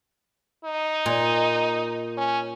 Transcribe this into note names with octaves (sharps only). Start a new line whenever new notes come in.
D#4
A#2
C#4